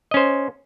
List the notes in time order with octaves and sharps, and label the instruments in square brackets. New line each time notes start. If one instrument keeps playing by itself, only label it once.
[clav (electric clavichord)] D#5
C#4
C5